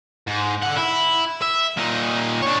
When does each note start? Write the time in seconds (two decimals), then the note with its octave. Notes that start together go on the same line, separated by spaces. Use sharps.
0.27 G#2
0.63 D3 F#5
0.77 E4
1.42 E5
1.77 A#2 D#4
2.43 D4 C#5